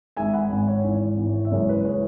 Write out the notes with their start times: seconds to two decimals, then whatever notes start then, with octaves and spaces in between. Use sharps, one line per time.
0.16 G#1 G#2 G#3 E5 G#5
0.33 F#5 B5
0.50 G#1 G#2 G#3
0.68 C#5
0.84 G#1 G#2 E3
1.17 G#1 G#2 E3
1.45 E5
1.51 F#1 F#2 E3 G#3 C#5
1.69 B4
1.85 E3 G#3 C#5